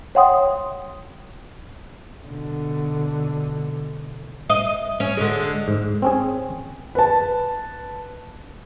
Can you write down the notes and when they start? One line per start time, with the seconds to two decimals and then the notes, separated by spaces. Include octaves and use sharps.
0.15 C#5 E5 F#5 G5 C6 D#6
2.26 B2 D3
4.50 D#5
5.00 C#4
5.17 D3 G#3
5.68 G#2
6.02 C4 C#4 G#4
6.95 B4 A5